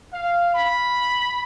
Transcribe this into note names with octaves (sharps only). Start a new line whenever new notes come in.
F5
B5